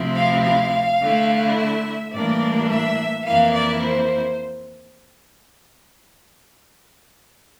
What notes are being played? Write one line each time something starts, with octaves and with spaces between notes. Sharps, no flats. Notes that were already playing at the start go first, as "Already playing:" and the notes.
Already playing: D2 C3 F3 C4 E4
F5
F5
D3 A3 E4
E5
A2 E3 G3 A#3 D4 D5
E5
F2 E3 A#3 E4 F5
D5
C5